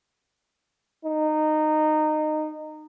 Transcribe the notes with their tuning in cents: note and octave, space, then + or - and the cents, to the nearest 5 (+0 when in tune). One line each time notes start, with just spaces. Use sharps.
D#4 -20